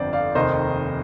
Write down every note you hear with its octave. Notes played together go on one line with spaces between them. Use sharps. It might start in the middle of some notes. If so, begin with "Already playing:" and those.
Already playing: G1 F2 D3 C5 D5
D5 F5
F1 D#2 D#3 C5 D#5